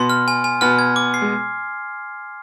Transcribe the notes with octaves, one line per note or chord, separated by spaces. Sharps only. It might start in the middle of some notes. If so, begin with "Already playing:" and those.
Already playing: B2 B3 C6
F6
G#5
G#5
B2 B3 F6
G#6
D6
C7
G#3